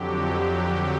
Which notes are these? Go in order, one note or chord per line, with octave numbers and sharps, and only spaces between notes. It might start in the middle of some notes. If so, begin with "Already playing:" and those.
Already playing: F2 D3 F#3 G4